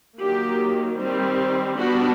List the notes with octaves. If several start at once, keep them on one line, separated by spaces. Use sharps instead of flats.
D#3 F#3 A#3 G4
D#3 G3 C4
G3 B3 D4 F#4